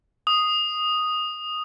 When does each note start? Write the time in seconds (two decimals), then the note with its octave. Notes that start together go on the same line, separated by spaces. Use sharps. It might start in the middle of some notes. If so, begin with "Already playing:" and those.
0.27 D#6